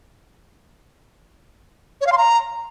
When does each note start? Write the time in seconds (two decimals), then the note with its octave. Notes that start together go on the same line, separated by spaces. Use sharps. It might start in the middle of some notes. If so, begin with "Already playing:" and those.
2.01 C#5
2.06 F5
2.12 C6
2.18 A#5